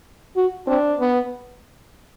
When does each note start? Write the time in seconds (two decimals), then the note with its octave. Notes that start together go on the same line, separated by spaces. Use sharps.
0.36 F#4
0.68 C4 D4
1.00 B3